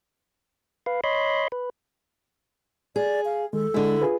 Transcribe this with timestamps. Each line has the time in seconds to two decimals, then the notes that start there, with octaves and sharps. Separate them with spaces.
0.86 B4 F5
1.04 C#5 D#5 B5 C6
1.52 B4
2.96 G#4 D5
3.25 F5
3.53 D#3 G#3 A4
3.74 D3 G#3 D4 E4
4.02 F4 G#4 B4